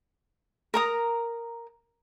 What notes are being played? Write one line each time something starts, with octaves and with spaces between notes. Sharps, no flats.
A#4 A#5 D#6